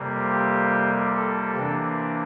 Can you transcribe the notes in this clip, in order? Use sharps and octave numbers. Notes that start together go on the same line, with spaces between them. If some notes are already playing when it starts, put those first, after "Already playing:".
Already playing: F2 C3 G3 A#3
G4
A4
C3 E3 A#3 D4